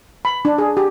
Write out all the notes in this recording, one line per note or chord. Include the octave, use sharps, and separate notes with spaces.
B5
D4
G#4
G4